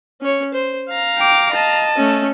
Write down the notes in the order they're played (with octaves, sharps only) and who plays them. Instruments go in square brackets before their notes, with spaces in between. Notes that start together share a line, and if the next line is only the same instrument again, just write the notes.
[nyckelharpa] C#4 C#5
C5
F5 A#5
[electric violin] G5 D6
D#5 A5
[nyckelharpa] A3 C#4